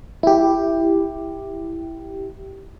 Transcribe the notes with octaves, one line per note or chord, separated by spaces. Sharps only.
E4 G4